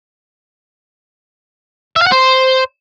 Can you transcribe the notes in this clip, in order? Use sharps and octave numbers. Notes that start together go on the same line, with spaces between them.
E5
F5
F#5
C5